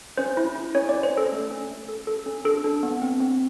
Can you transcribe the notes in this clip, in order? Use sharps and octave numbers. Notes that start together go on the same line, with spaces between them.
C#4 C5
E4
E4
C#4 C#5
C#4 D5
C5
C#4
A4
A3
C#4
A3
A4
A4
C#4
D4 A4
D4
B3
C4
C4